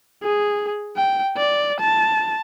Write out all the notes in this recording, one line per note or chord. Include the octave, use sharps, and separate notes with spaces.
G#4
G5
D5
A5